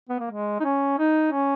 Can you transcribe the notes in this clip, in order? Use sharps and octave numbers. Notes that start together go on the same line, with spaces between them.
B3
A#3
G#3
D#4
C#4
D#4
C#4